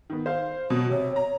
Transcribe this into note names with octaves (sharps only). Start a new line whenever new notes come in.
D#3 B3
C5 F5
B2 F#3 F#4
C3 C#5
C#5 A#5